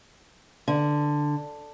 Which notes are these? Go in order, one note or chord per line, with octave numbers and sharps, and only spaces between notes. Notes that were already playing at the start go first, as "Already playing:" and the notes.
D3